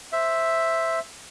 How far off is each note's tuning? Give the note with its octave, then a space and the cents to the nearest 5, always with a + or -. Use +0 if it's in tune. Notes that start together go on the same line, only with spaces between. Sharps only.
C5 +0 E5 +0